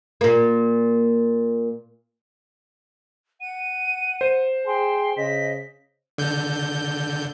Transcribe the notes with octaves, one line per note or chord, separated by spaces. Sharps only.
A#2 A#3
F#5 D#7
C5
G#4 G5 C6
C#3 D#5 B6
D3 G6